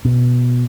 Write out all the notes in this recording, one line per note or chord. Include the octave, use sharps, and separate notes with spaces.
B2